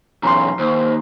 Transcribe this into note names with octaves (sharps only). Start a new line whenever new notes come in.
B1 E2 C#4 A#5 C6
D#2 C5